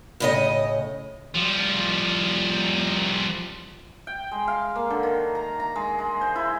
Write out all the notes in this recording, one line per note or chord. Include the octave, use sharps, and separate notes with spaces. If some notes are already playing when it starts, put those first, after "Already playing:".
A2 C#3 D#5
F3 G3
G5
G#3
F5
A#3
D3
D#3
A#5
A#5
G#3
G#3
C5
E4